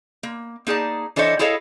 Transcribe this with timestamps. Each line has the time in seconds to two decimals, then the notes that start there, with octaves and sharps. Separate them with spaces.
0.23 A#3
0.67 A#3 D#4 G#4 D5 A5
1.16 E3 D4 A4 C5 C#5 D#5
1.39 E4 G#4 A4 C#5 D#5 F5